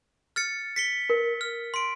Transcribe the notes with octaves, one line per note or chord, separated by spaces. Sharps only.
F6 A6 C#7
B6 C#7 G7
A#4
F6
C6 D7